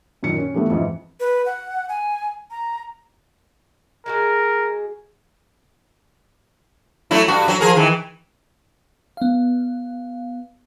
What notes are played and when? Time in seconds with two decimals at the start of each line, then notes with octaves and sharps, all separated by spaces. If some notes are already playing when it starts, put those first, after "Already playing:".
0.23 F#2 A#2 D#3 C#7
0.38 C#4
0.54 E3 G3 A3 B3
0.70 F2 G#2 E3
1.20 B4
1.46 F#5
1.89 G#5
2.50 A#5
4.06 G#3 F#4 G#4 A#4
7.11 F#3 A3 E4
7.28 G2 F#4
7.48 F#3
7.60 F3 G#4 A#4
7.75 D#3 E3
9.17 B3 F5